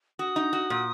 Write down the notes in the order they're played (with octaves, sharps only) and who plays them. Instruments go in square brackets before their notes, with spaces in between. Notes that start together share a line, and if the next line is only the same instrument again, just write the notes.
[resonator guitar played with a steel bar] F#4 [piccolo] D#6
[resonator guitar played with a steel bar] D#4
F#4
A#2